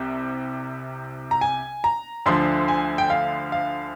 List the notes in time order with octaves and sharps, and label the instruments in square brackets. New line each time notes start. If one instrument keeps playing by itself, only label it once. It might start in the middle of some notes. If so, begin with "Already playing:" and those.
Already playing: [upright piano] C2 C3
A#5
G#5
A#5
D2 D3 F3 C6
G#5
G5
F5
F5